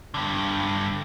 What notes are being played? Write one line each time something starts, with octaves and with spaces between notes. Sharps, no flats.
G2 D3